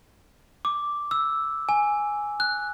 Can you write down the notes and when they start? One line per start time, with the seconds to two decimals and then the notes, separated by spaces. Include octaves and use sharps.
0.65 D6
1.11 E6
1.69 G#5
2.40 F#6